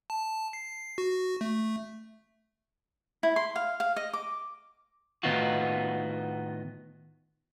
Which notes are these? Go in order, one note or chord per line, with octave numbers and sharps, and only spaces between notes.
A5
C7
F#4
A3
E4
C6
F5
F5
D#5
D6
A2 D#3 B3 D#4 F4 F#4